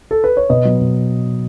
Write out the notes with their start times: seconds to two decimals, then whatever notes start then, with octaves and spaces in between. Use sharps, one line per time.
0.11 A4
0.24 B4
0.37 C#5
0.49 B2 B4 D#5
0.65 F#3 B3
0.81 B2